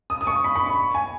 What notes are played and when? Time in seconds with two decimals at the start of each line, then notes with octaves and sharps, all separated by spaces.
0.10 D#6
0.21 D#6
0.27 C#6
0.44 B5
0.56 B5
0.66 C#6
0.95 G#5